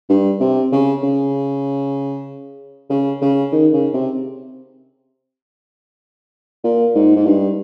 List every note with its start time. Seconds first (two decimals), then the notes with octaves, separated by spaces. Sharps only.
0.09 G2
0.40 C3
0.72 C#3
1.03 C#3
2.90 C#3
3.22 C#3
3.52 D#3
3.73 C#3
3.94 C3
6.64 A#2
6.95 G#2
7.16 G#2
7.26 G2